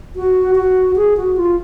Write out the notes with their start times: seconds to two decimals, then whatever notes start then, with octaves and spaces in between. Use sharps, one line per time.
0.16 F#4
0.55 F#4
0.96 G#4
1.17 F#4
1.37 F4